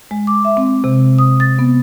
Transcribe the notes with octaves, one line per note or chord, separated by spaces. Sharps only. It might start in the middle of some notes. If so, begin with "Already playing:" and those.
G#3
D6
E5
C4
C3
D#6
A6
B3